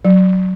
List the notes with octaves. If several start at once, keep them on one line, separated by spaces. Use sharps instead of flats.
F#3